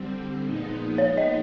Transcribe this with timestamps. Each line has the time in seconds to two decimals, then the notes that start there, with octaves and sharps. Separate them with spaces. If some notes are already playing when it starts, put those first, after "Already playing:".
Already playing: D3 G3 C4
0.43 A#2 F3 G#3 B3 D#4
0.98 C#5
1.17 D#5